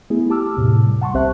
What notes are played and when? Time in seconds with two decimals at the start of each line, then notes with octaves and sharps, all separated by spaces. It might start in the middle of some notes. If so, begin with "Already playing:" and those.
0.10 A3 B3 E4 G#4
0.30 G4 A5 D6 E6 F6
0.57 E2 A2 C3
0.87 G3
1.01 F#5 A5 C6 C#6
1.14 B1 C4 G4 C5 E5 F#6